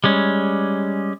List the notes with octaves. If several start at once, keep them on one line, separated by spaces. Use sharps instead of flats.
G3 G#3 C#4